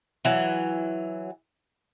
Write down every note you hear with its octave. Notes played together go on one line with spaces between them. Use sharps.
E3 F#3